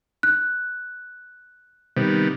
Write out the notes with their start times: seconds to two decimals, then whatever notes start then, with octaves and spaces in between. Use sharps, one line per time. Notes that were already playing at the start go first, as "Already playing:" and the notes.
0.23 F#6
1.97 C3 D#3 G3 B3